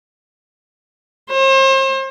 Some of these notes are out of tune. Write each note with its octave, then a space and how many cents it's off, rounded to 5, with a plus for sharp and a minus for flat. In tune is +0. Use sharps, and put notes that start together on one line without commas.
C5 +40